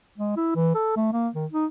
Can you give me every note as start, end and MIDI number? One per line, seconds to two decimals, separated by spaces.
0.18 0.33 56
0.36 0.55 64
0.55 0.72 52
0.74 0.92 69
0.96 1.10 57
1.13 1.28 58
1.35 1.45 51
1.52 1.66 63